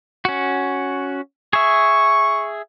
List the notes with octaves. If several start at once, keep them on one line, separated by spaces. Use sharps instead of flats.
C#4 F#4
G#4 E5 C#6